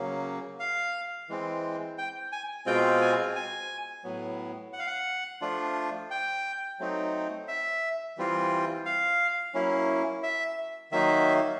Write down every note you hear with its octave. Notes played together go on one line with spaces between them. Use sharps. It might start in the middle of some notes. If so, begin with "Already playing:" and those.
Already playing: C#3 F#3 A#3
F5
E3 G#3 C4
G5
G#5
B2 G#3 C4 F4 G5
G#5
G#5
A2 F#3 B3
F#5
F5
F#5
F3 A3 D4 F4
G5
F#3 A3 C4 D#4
E5
E3 G3 C4 F4
F5
F#3 A#3 C#4 E4
E5
D#3 F#3 A#3 D#4 E5